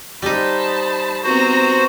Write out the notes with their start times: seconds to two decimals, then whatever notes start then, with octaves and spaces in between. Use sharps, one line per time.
0.22 G3 D#4 C5 A5 B5
1.24 B3 C4 F#4 C5 A#5